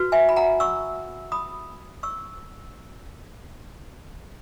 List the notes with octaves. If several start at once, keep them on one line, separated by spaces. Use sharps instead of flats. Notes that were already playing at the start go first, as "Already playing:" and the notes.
Already playing: F#4 B4
E5 G#5
B5
F#5 A#5
C#6 E6
B5 D#6
C#6 E6